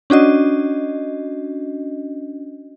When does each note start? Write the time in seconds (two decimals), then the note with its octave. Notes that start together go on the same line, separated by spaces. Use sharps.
0.10 C#4 D4 F#4 D#5